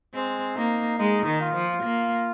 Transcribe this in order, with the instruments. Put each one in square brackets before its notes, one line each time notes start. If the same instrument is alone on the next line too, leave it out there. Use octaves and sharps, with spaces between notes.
[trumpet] G#3 [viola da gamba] C4
[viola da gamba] A#3 [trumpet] D#4
[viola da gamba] G#3 [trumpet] D#4
[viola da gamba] D#3
[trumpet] F4
[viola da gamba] F3
A#3